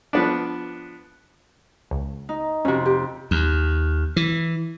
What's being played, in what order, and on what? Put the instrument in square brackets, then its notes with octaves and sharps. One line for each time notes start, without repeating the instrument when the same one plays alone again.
[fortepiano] F3 B3 D4
[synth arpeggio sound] C#2
[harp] D#4
[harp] F2 C3 [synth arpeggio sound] C#4 F#4
[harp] G4
[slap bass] D#2
E3